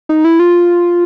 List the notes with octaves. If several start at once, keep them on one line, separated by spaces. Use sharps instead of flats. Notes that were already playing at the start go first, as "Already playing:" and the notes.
D#4
E4
F4